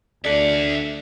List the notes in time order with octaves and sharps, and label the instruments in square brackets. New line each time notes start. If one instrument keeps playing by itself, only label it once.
[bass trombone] D2 [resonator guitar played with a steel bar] A4 D5 [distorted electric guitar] E5 F#5